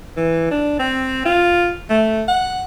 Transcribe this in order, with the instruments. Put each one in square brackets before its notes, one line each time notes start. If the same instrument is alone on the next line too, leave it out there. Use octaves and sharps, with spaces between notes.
[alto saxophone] E3
D4
C4
F4
A3
F#5